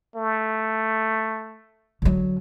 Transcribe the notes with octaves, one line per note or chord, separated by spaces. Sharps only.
A3
D3 F#3